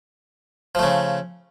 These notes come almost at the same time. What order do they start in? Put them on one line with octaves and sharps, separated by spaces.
F3 A3 C#3